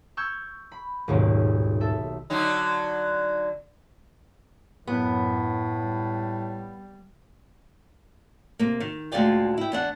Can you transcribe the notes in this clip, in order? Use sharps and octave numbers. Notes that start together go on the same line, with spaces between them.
C#6 E6 F6 G6 G#6
B5
D#1 B1 G#2 D#3
A4 E5
D3 F#3 D#4
F#2 A2 B3
G3
C3 A#3
D#3
D2 A#2 G#3 F4 D5 G5
E4 G5
E2 D4 F#5